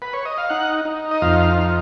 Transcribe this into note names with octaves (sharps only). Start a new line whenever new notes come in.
B4
C#5
D#5
F5
D#4 F#5
D#4
D#5
F2 F5
D#4